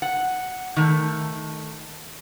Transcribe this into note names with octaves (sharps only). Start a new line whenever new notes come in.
F#5
D#3 A3